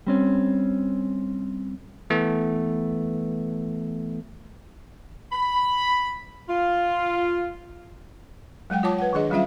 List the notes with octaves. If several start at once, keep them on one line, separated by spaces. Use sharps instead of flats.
G3 C4 C#4
E3 A3 B3
B5
F4
F#3 G#3 F#5 G5
F4 C#5 A5 D6
B4 F#5
D#3 D4 G#4 D#5
F#3 G3 C#4 F4 E5 F5